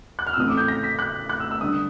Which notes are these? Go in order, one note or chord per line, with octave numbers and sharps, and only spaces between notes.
F#6
F6
E6
A1 A2 E3 A3 C4 D#6
D6
G6
A#6
B6
F#6
F#6
E6
E6
G2 D3 G3 D#6